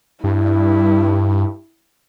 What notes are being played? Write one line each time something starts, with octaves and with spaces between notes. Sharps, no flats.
G2 E4